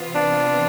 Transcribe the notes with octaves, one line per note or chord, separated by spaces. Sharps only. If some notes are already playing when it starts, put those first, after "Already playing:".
Already playing: C3 E3 B3 F4
D4